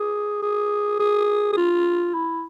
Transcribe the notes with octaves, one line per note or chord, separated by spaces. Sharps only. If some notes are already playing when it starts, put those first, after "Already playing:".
Already playing: G#4
G#4
G#4
G#4
F4
E4